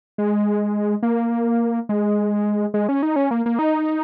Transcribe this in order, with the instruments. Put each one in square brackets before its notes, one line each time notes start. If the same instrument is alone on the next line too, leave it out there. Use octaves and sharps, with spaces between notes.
[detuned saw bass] G#3
A#3
G#3
G#3
C#4
D#4
C#4
A#3
A#3
D#4